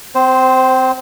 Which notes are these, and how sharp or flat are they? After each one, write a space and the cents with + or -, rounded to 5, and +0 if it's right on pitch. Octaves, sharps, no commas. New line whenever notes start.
C4 -25 C5 +0